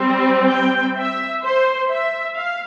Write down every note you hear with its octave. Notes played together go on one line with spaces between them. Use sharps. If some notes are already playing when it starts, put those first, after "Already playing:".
Already playing: G3 C4
G5
E5
C5
E5
F5